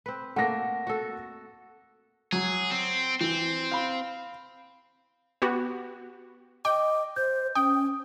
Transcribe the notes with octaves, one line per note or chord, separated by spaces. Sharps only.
C4 B4
A3 A#3 F#5 A#6
F#4 A4
F#3 G#4
C4
E3 C4
F5 B5
B3 F#4 G4
D#5 G5 D6
C5 G6
C#4 G5 D#6